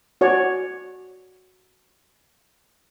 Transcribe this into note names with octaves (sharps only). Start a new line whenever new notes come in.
F#4 C#5 D5